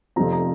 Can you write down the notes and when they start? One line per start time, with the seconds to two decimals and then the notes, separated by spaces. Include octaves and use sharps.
0.16 F1 F2 C3 F3 C4 A#5
0.33 A#5